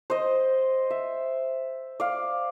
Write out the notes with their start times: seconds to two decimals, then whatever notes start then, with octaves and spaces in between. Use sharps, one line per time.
0.10 C5 D#5
0.90 E5
2.00 D5 F5